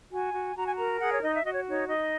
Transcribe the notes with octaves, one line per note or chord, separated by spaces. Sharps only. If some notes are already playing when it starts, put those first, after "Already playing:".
F#4 G#5
F#4
F#4 A#5
G#5
A#4 A#5
G#4 F#5
C#5
D#4 D#5
E5
F#4 D#5
C#5
D#4 C#5
D#4 D#5